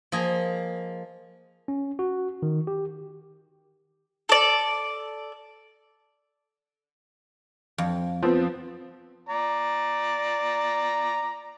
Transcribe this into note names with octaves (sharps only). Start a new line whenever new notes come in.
F3 A#3 G#4 D#5
C#4
F#4
D#3
G4
A4 D5
F2
F3 B3 C4
D5 A#5